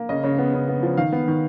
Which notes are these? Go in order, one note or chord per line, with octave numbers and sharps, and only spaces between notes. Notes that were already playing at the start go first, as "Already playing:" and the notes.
Already playing: A#3
C#3 D#5
C#3
B3
C#3
B3
F3
D#3 F5
B3
D#3